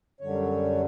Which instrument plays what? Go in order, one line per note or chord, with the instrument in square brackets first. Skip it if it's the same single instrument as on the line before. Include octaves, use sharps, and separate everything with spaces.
[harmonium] F#2 D3 G3 C#5